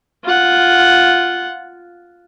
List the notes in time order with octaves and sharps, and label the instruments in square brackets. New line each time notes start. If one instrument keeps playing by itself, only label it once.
[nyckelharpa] F4 F#5